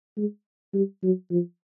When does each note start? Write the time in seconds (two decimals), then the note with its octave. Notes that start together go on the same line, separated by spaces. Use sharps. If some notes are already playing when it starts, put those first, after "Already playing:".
0.17 G#3
0.74 G3
1.03 F#3
1.31 F3